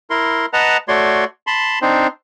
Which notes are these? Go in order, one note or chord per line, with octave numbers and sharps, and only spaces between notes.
E4 A#4 C6
B4 D#5 F#5 A5 A#5
A3 F#4 C#5 D5 C6
A5 B5 C6
C4 D4 D#4 C5